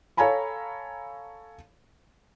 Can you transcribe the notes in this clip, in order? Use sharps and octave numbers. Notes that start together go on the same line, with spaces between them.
A4 C#5 F5 G#5 A#5 B5